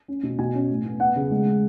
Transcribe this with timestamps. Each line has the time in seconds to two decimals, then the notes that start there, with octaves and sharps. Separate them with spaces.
0.08 C#4
0.23 B2
0.39 B2 G#5
0.55 C#4
0.69 A2
0.85 B3
1.00 B3 F#5
1.16 C#3
1.31 G#3
1.46 G#3